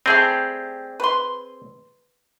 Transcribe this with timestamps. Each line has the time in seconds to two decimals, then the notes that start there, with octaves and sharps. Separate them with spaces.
0.06 G3 A3 C4 G4 G#4
1.00 B4 C6